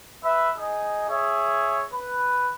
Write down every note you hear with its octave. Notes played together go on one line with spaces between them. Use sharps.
B4 E5
D#4 G#4 D#5
G#4 C#5 E5
B4